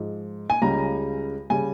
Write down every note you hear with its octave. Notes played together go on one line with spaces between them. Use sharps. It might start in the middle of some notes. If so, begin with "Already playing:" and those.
Already playing: G#2 F3
G#5
C#2 C#3 G3 A#5
C#3 G3 G#5